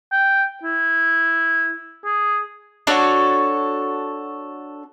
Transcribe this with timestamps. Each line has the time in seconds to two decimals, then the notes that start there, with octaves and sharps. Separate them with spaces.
0.12 G5
0.63 E4
2.05 G#4
2.87 D4 F#4 A4 C#5